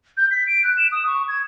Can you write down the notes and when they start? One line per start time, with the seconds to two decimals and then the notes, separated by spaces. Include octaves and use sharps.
0.17 G6
0.31 B6
0.47 D7
0.64 F#6
0.77 E7
0.92 D#6
1.07 C#6
1.28 G#6